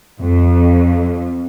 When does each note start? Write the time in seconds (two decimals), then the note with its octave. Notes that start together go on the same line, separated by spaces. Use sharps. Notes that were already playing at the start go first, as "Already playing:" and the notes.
0.21 F2